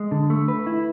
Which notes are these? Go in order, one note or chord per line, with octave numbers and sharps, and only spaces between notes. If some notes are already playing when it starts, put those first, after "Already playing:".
Already playing: G#3
D3
A3
B4
E4